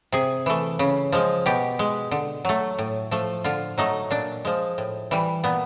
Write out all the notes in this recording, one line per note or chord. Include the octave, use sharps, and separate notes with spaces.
C3 G#4
E3 A3
C#3
F3 G#3
B2 G4
G#3
D3
F#3 A3
A2
F3 A3
D3 F4
F#3 A3 D#4
A#2 D4
F3 G#3
A2
E3 G3
A#2 B3